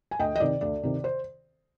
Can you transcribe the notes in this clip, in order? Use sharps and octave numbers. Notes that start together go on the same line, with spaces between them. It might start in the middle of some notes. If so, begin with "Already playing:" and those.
G#5
D2 D#5 G5
D#5
C3 D#3 D5
D2 D5
C3 D#3
C5